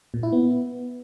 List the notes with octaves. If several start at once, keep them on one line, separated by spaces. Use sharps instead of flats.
A#2
E4
B3